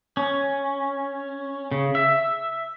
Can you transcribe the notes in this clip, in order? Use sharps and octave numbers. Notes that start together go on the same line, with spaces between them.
C#4
C#3
E5